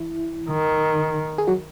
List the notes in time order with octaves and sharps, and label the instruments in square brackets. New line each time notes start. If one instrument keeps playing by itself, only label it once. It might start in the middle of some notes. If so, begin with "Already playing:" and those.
Already playing: [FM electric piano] E3 E4
[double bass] D#3
[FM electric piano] G#4
F#3 F#4